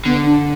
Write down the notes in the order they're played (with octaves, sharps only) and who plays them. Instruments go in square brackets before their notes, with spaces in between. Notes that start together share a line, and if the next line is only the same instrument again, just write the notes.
[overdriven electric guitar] D3 [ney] B3
[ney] D4